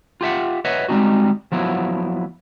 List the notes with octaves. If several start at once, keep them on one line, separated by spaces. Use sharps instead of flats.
F4 G4 E5 F#5
B4 C#5 D#5 E5 F#5
G3 G#3 A#3 C4 D#4 F#4
F3 F#3 B3 E4